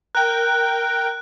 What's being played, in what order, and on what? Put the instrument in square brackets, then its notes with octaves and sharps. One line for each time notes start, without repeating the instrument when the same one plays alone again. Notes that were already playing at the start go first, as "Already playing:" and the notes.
[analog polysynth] A#4 G5 [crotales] F#6